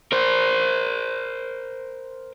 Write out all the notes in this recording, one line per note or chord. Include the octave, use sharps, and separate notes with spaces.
A#4 C5